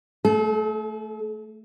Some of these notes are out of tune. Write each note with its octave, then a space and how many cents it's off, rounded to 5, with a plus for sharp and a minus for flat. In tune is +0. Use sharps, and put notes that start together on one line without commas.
A3 +0 A4 -45